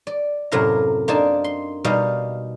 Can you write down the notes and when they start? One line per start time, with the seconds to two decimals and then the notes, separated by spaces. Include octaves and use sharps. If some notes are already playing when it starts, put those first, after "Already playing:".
0.07 D5
0.52 F#2 A2 C3 A#4 F5 A#5
1.08 A#3 D4 D#4 C5 D5 A5
1.44 C6
1.84 B2 G3 D#4 F5